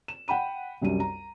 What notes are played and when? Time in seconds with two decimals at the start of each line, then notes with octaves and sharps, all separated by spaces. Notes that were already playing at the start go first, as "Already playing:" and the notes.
0.08 E7
0.28 F#5 G5 B5 D#7
0.82 C2 F#2 G3 D#7
1.00 A#5